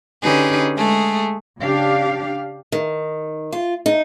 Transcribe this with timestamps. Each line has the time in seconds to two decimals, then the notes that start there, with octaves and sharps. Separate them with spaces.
0.23 D3 C#4 D#4 G4 G#4 B4
0.76 G#3 A3 G#4
1.60 C#3 D4 G4 F5
2.72 D#3
3.52 F4
3.86 D#4